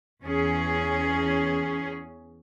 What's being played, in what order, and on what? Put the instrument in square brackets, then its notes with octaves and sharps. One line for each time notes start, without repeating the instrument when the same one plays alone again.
[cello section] E2 C#4 G#4